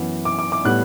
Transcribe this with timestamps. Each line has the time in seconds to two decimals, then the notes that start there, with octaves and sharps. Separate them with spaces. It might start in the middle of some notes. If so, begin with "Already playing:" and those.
Already playing: F#2 E3 B3
0.25 D6
0.39 D6
0.52 D6
0.65 A2 G3 B3 F#6